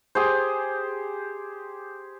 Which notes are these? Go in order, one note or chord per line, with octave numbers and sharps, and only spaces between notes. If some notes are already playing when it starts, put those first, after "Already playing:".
G4 G#4 C5